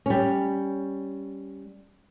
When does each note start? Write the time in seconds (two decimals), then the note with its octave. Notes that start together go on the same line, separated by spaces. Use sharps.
0.06 G3 C#4